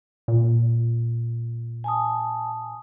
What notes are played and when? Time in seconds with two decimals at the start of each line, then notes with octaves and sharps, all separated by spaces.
0.28 A#2
1.84 G#5 A5 D#6